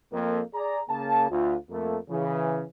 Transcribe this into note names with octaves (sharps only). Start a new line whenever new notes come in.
F2 A#3
G#4 D5 A#5
C#3 A#3 A5
D2 F4
F2 A3 A#3
C#3 E3